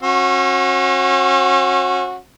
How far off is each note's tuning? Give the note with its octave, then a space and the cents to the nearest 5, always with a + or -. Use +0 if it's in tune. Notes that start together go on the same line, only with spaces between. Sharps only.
C#4 -40 F#4 -20